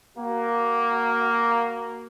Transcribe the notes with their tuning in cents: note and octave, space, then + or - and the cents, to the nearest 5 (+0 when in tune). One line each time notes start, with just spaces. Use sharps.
A#3 +0 F#4 +20